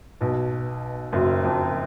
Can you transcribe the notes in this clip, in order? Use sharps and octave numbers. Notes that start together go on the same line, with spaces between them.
B1 B2
F#1 F#2
F2